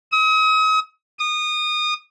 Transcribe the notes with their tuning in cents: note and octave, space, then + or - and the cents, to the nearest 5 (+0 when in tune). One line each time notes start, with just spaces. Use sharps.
D#6 +40
D#6 -25